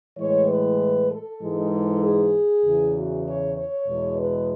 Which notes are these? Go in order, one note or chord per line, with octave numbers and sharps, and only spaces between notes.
A2 E3 G#3 C#5
B4
A4
G#2 E3 G#3
G#4
E2 C#3 E3
F#4
C#5
C#5
E2 B2 G#3
B4